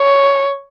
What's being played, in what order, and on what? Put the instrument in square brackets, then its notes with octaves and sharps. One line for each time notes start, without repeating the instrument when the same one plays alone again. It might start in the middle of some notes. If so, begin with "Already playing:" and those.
Already playing: [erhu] C#5